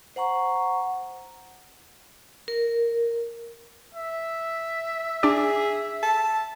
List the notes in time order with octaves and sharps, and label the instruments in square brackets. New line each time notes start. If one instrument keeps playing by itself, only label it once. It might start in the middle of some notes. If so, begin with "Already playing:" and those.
[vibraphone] C5 F#5 A#5 C#6
A#4
[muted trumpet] E5
[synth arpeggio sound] D4 D5 [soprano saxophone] G#4
[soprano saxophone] A5